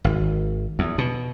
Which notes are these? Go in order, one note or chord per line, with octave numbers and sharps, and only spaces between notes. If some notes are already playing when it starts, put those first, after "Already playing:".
G#1
E2
B2